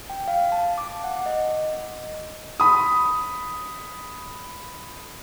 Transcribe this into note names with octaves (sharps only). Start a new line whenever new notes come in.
G5
F5
A5
D6
F#5
D#5
B5 D#6